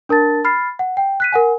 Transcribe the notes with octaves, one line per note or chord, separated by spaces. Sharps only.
D4 A#4 A5 A6
B5 F6 A6 C7
F#5
G5
F#6 B6 D#7
A#4 F#5 G#5